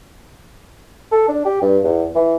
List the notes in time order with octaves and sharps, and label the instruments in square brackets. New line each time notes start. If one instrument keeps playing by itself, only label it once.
[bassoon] A4
D4
G4
G2
E2
E3